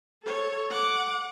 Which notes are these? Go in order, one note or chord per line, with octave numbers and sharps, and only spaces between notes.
A4 C#5
F#5 D6